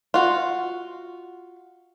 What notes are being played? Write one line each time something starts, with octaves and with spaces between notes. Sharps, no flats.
F4 F#4